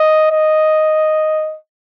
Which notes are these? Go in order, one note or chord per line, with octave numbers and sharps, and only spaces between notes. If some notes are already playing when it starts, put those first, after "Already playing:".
Already playing: D#5
D#5